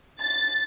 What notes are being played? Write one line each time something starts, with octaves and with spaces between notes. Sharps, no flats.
A6